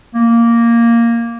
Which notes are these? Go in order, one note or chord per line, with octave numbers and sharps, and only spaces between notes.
A#3